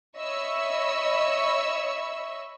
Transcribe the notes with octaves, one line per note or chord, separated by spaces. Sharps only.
C#5 D#5 E5 B5 C#6 E6